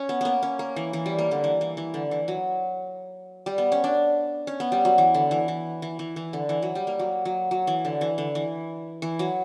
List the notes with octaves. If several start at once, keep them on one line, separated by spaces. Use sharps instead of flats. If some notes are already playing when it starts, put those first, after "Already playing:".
Already playing: C#4
B3
A#3 B3
C#4
A#3
E3
E3
G3
A#3
D3
E3
E3
E3
D3
E3
F#3
G3
B3
C#4
D4
C#4
B3
G3
F#3
E3
D3
E3
E3
E3
E3
E3
D3
E3
F#3
G3
A#3
F#3
F#3
F#3
E3
D3
E3
D3
E3
E3
F#3